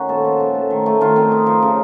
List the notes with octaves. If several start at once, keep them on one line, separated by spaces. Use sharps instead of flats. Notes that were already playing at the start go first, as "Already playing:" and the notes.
Already playing: D#3 C#4 F#4
A#2 A4 C5
F3
A#2
A3
D#3
A3
D#3 F4
C4
D#4
F3
C#3